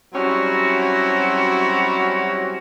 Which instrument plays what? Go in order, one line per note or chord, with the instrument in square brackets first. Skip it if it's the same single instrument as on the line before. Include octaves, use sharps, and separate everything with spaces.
[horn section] F#3 G3 C4 C#4 E4 F#4